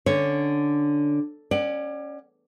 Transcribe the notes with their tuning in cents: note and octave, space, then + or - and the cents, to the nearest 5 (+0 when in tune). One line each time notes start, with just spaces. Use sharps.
D3 +0 C#4 +0 C#5 +0
C#4 +0 D5 +30 F#5 +45